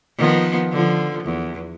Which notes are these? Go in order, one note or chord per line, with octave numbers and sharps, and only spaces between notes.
D#3 F3 B3
D3 F3
E2